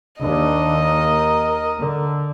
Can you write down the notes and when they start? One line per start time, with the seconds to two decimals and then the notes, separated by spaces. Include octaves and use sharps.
0.21 D#2 D#3 D4 D#5
0.76 A#4
1.78 D3